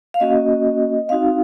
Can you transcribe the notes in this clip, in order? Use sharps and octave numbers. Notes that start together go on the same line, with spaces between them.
F5
A#3 C#4 F#4 D#5
C4 D#4 F#4 F5